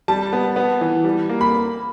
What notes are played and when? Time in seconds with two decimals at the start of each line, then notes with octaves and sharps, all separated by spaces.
0.08 G3 A5
0.33 B3
0.56 B3
0.81 E3
1.04 G3
1.29 A#3
1.41 B5